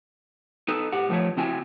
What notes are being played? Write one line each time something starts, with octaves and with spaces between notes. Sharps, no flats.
D#4 A4 B4
G#2 G4 F#5
D#3 F3 A3 B4 C#5
C#3 C4 E4 F#4 G5 G#5